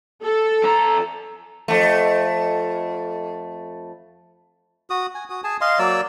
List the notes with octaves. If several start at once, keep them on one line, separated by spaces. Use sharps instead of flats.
A4
F2 A#5
F2 A3
F#4 D#6
G#5
F#4 D#6
G#4 G#5 A5
D#5 F5 C6
F#3 A#3 D5 E6